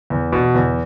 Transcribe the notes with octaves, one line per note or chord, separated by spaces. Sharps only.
E2
B2
E2